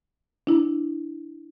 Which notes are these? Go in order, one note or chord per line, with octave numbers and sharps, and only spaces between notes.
D4 E4